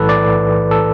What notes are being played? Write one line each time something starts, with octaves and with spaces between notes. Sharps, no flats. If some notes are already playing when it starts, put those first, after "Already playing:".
Already playing: B1 A2 E3 A4 B4
D5
A4